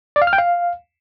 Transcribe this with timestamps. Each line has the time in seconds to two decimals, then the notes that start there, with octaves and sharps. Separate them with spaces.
0.16 D5
0.22 F5
0.27 F6
0.33 G5
0.38 F5